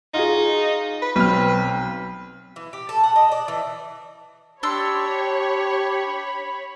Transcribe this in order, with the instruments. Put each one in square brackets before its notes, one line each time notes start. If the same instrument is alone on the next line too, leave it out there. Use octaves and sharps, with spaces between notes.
[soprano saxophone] D#4 [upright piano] F4 F#4 G#4
[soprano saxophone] B4
[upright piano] B1 C4 F6 [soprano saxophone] B4
[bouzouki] E3
G4
A4
F#5
D#5
D5
E3
[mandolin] D4 C6 E6 [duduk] G4 [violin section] C#5 [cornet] B5